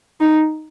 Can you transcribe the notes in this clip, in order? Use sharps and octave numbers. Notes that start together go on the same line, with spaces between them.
D#4